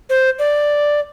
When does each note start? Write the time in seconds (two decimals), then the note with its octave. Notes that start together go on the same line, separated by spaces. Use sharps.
0.10 C5
0.39 D5